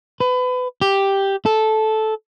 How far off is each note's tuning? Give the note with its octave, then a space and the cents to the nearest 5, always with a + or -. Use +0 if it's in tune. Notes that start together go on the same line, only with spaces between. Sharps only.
B4 +30
G4 +0
A4 -10